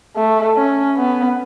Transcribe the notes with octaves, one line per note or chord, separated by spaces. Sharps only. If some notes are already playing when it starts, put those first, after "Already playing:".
A3
C#4
B3